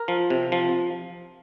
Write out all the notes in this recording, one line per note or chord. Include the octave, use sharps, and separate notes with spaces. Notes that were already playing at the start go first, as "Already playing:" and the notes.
Already playing: A#4
F3
C3
F3